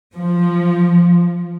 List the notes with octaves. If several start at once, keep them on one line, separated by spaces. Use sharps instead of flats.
F3